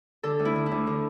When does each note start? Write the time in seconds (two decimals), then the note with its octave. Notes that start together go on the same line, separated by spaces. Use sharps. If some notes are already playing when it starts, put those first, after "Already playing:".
0.23 D3 A4
0.39 D2
0.45 E4
0.56 D3
0.66 E4
0.71 D2
0.87 D3